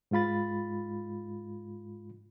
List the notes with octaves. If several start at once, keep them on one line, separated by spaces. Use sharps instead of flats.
G#2 G#3 F4 B5 A6